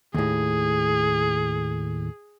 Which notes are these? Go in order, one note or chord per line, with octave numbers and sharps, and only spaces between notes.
D#2 A2 G#4